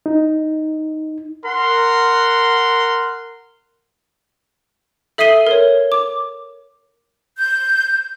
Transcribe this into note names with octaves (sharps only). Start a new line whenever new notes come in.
D#4
A#4 F#5 C6
A4 E5 D#6 C7 D#7 G7
A#4 C#5
D6
G6